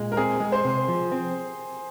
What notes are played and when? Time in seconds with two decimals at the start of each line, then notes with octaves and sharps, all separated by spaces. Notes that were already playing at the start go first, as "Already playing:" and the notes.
Already playing: A#2 G#3
0.12 A#4
0.17 C4 G#4
0.40 G#3
0.52 C5
0.64 C3
0.88 F3
1.12 C4